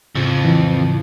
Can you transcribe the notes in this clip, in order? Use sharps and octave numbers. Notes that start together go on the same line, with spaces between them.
F2 A2 C#3 F3
E3